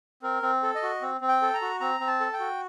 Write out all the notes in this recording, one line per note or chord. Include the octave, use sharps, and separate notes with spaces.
C4 A#4
C4
A4
D#5
F#4
C4
C4
G5
A4
A#5
F#4
C4 A#5
C4
A5
A4
G5
F#4